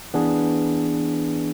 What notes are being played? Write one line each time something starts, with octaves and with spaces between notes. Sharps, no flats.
E3 B3 D4 G#4